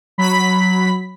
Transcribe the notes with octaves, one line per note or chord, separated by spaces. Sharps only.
F#3 B5 B6